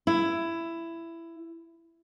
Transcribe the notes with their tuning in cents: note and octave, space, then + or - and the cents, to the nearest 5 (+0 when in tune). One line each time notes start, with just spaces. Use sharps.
E4 +15